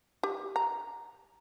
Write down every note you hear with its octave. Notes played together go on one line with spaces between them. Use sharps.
G4
A#5